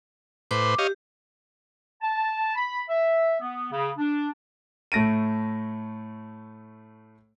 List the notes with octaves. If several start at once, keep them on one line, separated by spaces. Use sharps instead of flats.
A2 B4 C5 D6
G4 C#5 D#5 F5
A5
B5
E5
B3
C#3
D4
A2 A3 A#6 D7 D#7